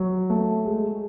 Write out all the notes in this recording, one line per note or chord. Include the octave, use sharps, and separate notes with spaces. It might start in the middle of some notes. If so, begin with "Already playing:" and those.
Already playing: F#3
A3
G#3